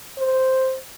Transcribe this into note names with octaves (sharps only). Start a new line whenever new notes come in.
C5